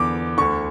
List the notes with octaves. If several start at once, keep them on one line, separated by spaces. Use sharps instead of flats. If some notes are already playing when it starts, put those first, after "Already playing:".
Already playing: E2 D3 D6
D2 D3 C#6